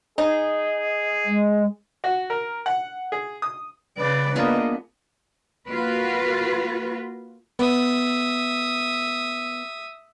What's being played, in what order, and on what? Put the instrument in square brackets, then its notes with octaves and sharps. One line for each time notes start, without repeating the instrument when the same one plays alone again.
[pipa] D#4 [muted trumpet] G#4
[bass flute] G#3
[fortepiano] F#4
A#4
F#5
G#4
D#6
[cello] C#3 [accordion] B4 [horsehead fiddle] D5
[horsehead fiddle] A#3 D#5 [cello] B3 [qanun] D4 F4 G#4
[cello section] A#3 F4 F#4 B4
[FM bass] B3 [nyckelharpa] E5 D#6